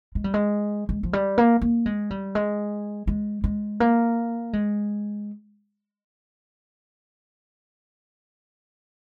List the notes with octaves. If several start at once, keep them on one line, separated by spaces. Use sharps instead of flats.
G#3
G3
G#3
G#3
F3
G3
A#3
A#3
G#3
G3
G#3
G#3
G#3
A#3
G#3